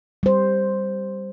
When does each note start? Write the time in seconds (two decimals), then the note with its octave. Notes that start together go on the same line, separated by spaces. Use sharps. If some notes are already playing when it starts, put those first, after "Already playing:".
0.23 G3 C5